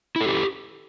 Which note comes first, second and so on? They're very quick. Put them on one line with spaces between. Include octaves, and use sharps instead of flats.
E4 A4 G4